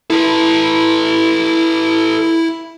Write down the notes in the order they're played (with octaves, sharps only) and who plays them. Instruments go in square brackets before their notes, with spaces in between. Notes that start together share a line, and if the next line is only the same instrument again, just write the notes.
[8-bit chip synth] E4 [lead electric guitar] A4 B4